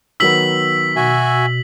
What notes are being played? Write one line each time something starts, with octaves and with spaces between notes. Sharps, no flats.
D#3 F#3 B3 E6 B6 F#7
B2 F#4 E5 G#5